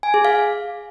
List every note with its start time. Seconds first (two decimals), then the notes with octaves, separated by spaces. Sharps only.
0.03 G#5
0.14 G#4
0.25 F5